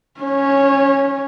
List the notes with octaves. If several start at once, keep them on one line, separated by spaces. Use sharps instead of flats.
C#4 C#5